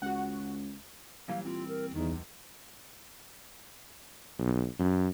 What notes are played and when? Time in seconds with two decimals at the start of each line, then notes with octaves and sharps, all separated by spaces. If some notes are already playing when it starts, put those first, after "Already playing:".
0.02 C#2 F#4 F#5
1.28 A#2 E3 F#3 G3 F5
1.45 C4 F4
1.68 A#4
1.94 E2 D#3 D#4
2.10 C#2
4.39 B1
4.79 F#2